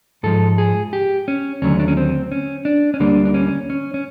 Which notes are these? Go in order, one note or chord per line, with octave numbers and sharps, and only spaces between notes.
G#2 F3 G#3 A4
G#4
G4
C#4
D#2 D3 F#3 A3 C#4
D4
C#4
C4
C#4
D4
C#4
D2 D3 G3 A#3 D4
D4
C#4
C#4
C#4